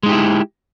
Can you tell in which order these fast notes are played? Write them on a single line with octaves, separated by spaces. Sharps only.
G#3 D#4 G4 E4